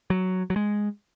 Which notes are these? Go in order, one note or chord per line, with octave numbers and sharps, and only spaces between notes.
F#3
F#3
G#3